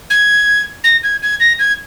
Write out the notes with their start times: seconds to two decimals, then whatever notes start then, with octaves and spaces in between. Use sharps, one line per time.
0.10 G#6
0.84 A#6
1.03 G#6
1.22 G#6
1.40 A#6
1.59 G#6